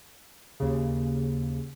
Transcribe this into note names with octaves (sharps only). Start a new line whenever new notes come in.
D#2 C#3